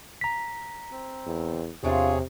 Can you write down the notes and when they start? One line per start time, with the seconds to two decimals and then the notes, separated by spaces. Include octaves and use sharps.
0.21 A#5 B6
0.91 C4
1.27 E2
1.83 E2 C3 F3 D4 F4 G#4 C#5 E5